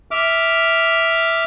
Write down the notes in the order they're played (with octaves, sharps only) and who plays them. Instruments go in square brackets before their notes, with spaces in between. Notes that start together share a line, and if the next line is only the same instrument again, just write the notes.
[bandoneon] E5 D6 F6